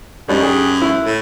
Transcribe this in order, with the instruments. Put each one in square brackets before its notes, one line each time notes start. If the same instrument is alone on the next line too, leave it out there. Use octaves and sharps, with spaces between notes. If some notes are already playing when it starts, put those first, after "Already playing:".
[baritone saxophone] F#2 [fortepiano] G3 D4 D#4
[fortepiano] G4 G#4
E4
[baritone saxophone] A2